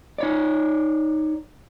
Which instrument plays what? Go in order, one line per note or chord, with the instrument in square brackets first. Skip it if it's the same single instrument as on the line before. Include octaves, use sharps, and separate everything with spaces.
[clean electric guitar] D#4 C#5 D5